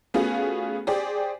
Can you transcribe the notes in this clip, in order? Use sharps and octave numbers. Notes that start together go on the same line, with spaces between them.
A3 B3 C#4 F4 F#4 G#4
G4 G#4 C5 D5